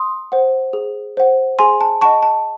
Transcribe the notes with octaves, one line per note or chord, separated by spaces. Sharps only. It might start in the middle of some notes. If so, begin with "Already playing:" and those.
Already playing: C6 D#6
C5 F#5
G#4
C5 F#5
G#4 G#5 C6
A5
D#5 F#5 A5 C#6
A5